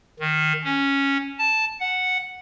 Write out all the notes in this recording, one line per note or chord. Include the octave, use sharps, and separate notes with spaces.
D#3
C#4
A5
F#5